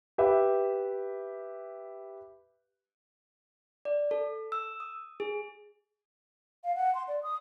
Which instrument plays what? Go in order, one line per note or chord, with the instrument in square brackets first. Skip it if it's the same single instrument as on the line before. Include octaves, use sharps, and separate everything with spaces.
[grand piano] G4 B4 E5
[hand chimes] D5
A4
E6
D#6
G#4
[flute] F5
F#5
C6
D5
D#6